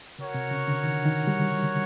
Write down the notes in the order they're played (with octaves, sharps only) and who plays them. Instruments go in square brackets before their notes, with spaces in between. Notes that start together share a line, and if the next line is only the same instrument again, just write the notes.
[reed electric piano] C#3 [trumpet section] F#4 A#4 C#5 F#5
[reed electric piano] C3
C#3
D3
D#3
D3
D#3
G3